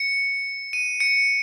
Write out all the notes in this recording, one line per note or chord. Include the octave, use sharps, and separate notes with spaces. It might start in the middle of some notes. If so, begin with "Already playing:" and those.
Already playing: C#7
D#7
C#7